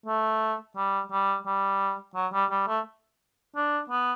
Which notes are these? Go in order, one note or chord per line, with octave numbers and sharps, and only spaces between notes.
A3
G3
G3
G3
F#3
G3
G3
A3
D4
B3